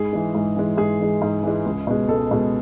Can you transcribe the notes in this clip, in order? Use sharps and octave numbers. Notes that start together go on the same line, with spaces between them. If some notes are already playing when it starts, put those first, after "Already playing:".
Already playing: G#2 G#4
E3 G#3
G#2
E3 G#3
G#2 G#4
E3 G#3
G#2
E3 G#3
C#2
B2 G#3
C#2 A4
B2 G#3